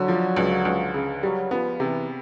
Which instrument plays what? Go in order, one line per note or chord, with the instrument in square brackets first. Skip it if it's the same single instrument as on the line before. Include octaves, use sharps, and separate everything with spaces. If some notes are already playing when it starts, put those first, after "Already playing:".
Already playing: [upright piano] D3 [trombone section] F#3
[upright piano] F3
C#2
C#2
C#3
[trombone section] F#3 [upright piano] G3
[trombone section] F3 [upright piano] B3
[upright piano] C3 [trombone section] E3